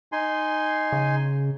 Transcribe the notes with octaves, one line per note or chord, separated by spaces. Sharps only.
D#4 G#5 C6
C#3